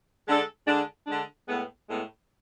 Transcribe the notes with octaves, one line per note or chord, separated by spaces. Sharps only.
D3 G#3 D4 A4
D3 G#3 D4
D3 G#3 D4
A2 G#3 B3
A2 G#3 B3